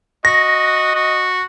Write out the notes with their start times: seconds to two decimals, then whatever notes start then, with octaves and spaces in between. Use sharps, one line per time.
0.25 F#4 D#5 A#6
0.95 F#4